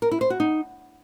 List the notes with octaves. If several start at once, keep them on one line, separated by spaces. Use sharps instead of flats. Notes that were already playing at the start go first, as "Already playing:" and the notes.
A#4
E4
C5
F#4
D#4